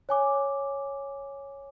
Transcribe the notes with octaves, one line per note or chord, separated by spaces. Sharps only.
C#5 G#5 D6